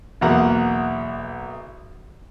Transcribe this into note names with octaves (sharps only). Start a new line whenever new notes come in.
B1 E2 A#3 F#5 A#5